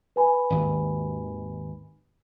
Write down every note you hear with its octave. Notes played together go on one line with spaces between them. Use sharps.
B4 G#5 B5
G#1 D#2